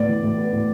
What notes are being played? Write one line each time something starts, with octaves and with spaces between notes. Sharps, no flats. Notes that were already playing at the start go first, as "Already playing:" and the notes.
Already playing: A2 B3 D5
E3
A2
B3
A2